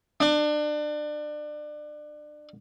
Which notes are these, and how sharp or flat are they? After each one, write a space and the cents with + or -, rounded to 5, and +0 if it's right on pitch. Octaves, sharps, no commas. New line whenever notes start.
D4 +30